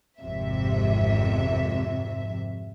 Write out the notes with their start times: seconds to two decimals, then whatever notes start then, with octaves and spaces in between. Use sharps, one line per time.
0.20 G#1 F2 C3 E5